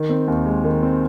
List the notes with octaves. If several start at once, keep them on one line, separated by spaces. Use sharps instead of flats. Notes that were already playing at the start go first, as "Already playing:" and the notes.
Already playing: D#3
C4
D#2
G#3
D#3
C4